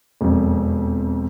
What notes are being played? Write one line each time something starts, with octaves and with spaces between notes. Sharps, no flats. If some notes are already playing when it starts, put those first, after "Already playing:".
E1 F2